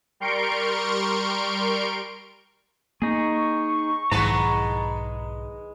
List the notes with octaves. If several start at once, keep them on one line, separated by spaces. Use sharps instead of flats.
G3 A#4 C6 C#6 D7
A#3 D#4 G#4 C#6
B1 G#2 D#3 G#3 B4 F#5 A5 A#5